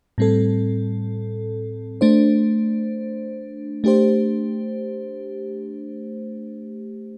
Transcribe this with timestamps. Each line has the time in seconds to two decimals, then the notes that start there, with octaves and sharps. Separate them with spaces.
0.18 A2 G3 C4 A4
2.01 A3 D4 C5
3.84 A3 D4 G4 C5